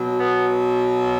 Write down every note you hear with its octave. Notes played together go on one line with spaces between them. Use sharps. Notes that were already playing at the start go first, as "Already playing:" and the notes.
Already playing: B2 F#3
B3